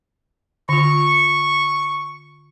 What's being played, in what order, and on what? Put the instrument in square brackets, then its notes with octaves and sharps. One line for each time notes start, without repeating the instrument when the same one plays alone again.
[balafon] D3 F4 [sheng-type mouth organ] C#6